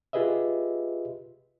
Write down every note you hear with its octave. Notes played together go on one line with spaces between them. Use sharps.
F4 G4 G#4 B4 D#5 E5